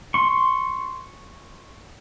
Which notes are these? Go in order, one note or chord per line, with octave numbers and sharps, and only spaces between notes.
C6 C#6